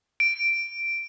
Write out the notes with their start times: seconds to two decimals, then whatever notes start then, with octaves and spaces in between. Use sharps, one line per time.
0.20 D7